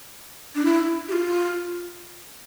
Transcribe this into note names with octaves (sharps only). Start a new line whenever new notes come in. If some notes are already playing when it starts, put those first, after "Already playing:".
D4
E4
G4
F4